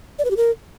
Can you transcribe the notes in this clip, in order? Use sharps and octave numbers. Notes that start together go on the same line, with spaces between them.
D5
B4
G4
A#4